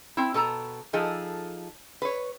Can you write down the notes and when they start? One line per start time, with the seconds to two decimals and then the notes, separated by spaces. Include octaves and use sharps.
0.17 C4 E4
0.34 B2 A4 A5 A#5
0.93 F3 D#4 G#4 A4
2.02 B4 C#5